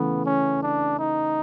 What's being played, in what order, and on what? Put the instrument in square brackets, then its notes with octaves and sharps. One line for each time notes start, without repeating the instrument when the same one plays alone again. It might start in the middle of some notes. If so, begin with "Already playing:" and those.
Already playing: [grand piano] C#3 E3 A3 [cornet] B3
[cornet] C#4
D4
D#4